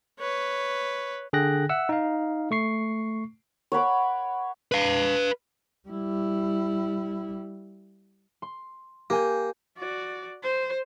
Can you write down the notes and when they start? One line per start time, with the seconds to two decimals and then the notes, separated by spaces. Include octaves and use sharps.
0.19 B4 C#5
1.33 D3 G#4 G5 F#6 A#6
1.69 E5 F#5 E6
1.89 D#4 F5
2.51 A3 C#6 C7
3.72 C#5 F#5 B5 D6
4.72 B4 F5
5.89 G3 E4
8.42 C6
9.10 A#3 G4 G#5 G6
9.78 F#4 D5
10.43 C5